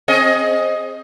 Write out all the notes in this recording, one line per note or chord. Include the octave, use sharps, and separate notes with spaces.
C4 G#4 D#5